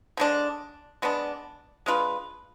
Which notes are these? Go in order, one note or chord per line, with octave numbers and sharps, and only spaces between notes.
D3 G#3 D4
G#3 B3 D4
G#3 D4 F4 B4